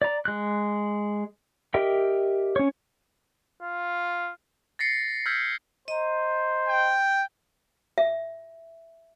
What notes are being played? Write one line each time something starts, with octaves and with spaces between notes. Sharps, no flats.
D5 A#5
G#3 F#6
G4 A#4 D#5 E5 G5
C#4 C#5
F4
A6 A#6 C7 C#7
E6 F6 G6 G#6 B6
C5 D#5 A#5
G5
E5